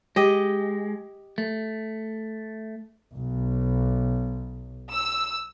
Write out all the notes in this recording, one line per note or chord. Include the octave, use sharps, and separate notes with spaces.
G#3 G4 D#5
A3
B1
E6